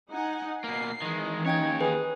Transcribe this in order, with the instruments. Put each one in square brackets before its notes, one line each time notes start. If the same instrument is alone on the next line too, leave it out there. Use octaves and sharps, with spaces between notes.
[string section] D#4 F#5 G#5
[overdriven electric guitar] B2 A#3 [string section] C7
[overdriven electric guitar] D#3 G#3 [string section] E3
[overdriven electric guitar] D#2 C#5 [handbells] C#4 G5 G#6 [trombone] D#4
[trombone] G#4 [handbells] B4 D#6